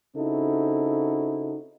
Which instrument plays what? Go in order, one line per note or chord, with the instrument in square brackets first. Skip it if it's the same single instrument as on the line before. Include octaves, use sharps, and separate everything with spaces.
[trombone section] C#3 C4 D#4 E4 F#4 A4